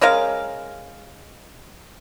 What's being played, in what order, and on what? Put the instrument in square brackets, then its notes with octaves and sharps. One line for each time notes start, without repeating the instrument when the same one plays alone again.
[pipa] G#3 C#4 A#4 F5